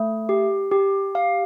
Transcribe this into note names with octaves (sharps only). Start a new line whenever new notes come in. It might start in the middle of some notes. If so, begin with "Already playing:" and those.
Already playing: A3
G4
G4
F5